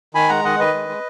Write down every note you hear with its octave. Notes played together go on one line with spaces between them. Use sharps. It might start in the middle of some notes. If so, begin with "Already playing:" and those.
D#3 G#5 B5
G#3 F#5 A#5
D#3 D#5 F#5
D#3 B4 D#5
G#3
G#3